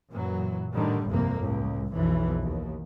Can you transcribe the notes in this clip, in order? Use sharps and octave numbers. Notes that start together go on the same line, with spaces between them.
F#2 A#2 E3 F#3
A2 D3 D#3 G3
G1 C2 F2 C3 A#3
C#2 A2
B1 F2 E3
D#2